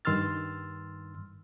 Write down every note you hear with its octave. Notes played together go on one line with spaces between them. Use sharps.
G2 D#3 C6 E6 F6 A6